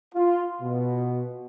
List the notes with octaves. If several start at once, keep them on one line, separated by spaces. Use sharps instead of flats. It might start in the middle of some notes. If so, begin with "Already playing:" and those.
F4
B2